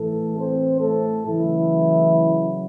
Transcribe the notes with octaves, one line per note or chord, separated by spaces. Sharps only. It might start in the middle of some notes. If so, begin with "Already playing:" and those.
Already playing: A2 E3 A3 A4
C4 C5
A3 A4
C#3 E3 F#3 A3 E4